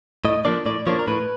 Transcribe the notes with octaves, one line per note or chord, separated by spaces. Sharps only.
A2 D#5
F3 A#3 D4 D5
A2 D5
F3 A#3 D4 C#5
A#4
A2 B4